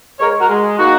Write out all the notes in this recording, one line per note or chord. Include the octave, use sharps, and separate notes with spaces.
G#3 A#4 C#5
F#4 A#4
G#3
A#3 D#4 F#4